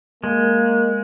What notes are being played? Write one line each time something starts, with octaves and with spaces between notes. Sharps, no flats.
G#3 A#3